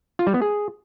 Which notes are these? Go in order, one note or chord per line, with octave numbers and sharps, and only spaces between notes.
F4
G3
B3
G#4